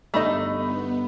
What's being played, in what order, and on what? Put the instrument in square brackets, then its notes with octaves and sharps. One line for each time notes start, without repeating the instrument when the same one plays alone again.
[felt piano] G1 B5 [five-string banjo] A3 D#4 D#5
[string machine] B3